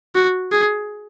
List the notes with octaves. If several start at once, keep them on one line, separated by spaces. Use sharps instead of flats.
F#4
G#4